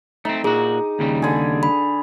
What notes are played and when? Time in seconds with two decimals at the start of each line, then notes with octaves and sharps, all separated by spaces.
0.25 A3 C4 D#4
0.44 A#2 D#4 F#4 G#4
0.99 D#2 C#3 G3
1.22 D3 G#4
1.63 B5